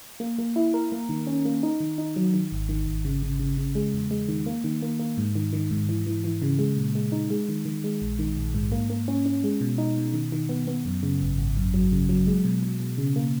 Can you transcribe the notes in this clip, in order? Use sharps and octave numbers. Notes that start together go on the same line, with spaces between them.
A#3
A#3
E4
A#4
A#3
D#3
C#4
A#3
D#4
D#3
D#4
F#3
D#3
G#1
D#3
G#1
C#3
C#3
C#3
C#3
G#3
E2
G#3
D#3
A#3
D#3
A#3
A#3
G#2
D#3
D#3
G#2
E3
E3
E3
C#3
G#3
A#2
G#3
D#4
G#3
D#3
D#3
G#3
A#1
D#3
A#1
G#2
A#3
A#3
C#4
C#4
G#3
B2
D#4
B2
D#3
D#3
B3
B3
F#2
C#3
G#1
G#1
F#2
F#3
C#3
F#3
G#3
B2
B2
B2
C#3
A#3